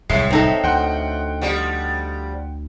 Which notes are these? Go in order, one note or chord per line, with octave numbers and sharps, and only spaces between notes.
D1 C2 A2 G#3 C#5 E5 C7
C4 D#4 A4
D2 F#5 G5 C6
F3 G3